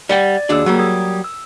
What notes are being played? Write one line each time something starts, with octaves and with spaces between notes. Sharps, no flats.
G3 D5 F#5 G5 A6
D#2 D4 F#4 G#4 D5 E6
F#3 G3 A#3
A#4 D#6 G#6
E6